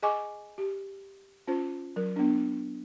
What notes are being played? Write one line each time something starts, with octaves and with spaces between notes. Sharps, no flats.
G#4 D#5 G#5 C#6 D6
G4
C#4 F4 C5
F#3 A#4
B3 D4